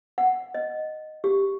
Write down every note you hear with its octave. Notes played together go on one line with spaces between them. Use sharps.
F#5
D#5
G4